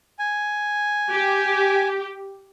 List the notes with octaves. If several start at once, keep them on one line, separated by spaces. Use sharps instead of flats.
G#5
G4